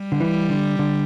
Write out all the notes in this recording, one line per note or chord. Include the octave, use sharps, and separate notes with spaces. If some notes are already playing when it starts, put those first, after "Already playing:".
Already playing: G3
D3
E3
D3
D3